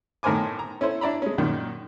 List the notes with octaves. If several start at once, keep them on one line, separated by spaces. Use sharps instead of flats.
A2 D#3 A#4 C5 G#5 D6
A#5
C#4 E4 A4 C5 C#5
D4 E4 D5 A#5 B5
G#3 C#4
F#2 A#2 D#3